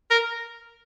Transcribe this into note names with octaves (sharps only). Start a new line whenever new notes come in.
A#4